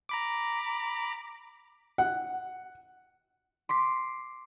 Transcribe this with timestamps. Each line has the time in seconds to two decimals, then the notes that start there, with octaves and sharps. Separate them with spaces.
0.09 A#5 B5 D6
1.98 F#5
3.69 C6 D6 B6